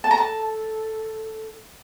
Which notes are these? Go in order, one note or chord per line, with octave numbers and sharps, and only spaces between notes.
A4 A5
A#5
A5